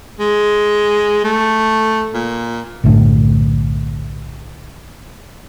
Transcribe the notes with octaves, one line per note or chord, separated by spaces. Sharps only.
G#3
A3
A#2
B1 F#2 A2 D3